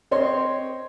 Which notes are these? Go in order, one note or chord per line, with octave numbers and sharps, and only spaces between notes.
C4 C#5 D#5 C6